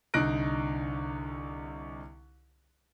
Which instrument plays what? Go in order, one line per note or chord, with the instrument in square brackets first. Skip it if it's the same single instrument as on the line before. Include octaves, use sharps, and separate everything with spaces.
[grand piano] C2 D3 D#4 F#6 A#6 D7